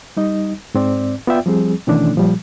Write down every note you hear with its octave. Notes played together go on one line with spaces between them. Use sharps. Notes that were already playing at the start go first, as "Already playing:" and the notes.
G3 D#4 D#5
G#2 C4 D5
B3 F4 D5 E5 G5
F3 G3 C4 G#4
B2 D#3 E3 A3 C#4 D4
A#2 F3 G3